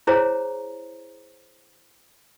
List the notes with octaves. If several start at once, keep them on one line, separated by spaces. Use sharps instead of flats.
E4 G#4 C5 C#5 A#5